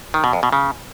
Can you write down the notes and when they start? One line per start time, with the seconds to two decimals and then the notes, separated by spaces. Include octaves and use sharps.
0.14 D#3
0.24 B2
0.33 F2
0.43 B2
0.53 C#3